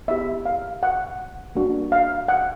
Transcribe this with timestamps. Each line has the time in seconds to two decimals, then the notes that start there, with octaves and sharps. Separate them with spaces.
0.08 B3 E4 G4 E5
0.45 F5
0.83 F#5
1.55 G3 A#3 D4 F#4
1.92 F5
2.28 F#5